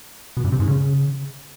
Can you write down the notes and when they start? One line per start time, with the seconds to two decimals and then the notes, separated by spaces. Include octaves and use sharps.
0.37 B2
0.44 G2
0.52 C3
0.60 G#2
0.68 C#3